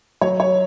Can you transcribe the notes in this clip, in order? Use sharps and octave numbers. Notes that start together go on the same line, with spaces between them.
F#3 C#5
C#5